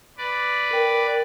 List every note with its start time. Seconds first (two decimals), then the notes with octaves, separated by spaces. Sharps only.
0.18 B4 D5
0.71 A#4 G5